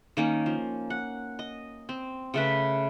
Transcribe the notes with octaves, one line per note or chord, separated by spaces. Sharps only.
D#3 A#3 C#4
F3
F#5
D#5
C4
C#3 A3 B4